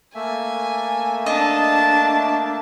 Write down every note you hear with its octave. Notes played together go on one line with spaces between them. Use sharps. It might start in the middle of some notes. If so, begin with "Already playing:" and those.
A3 A#3 E5 G#5
D4 D#5 A5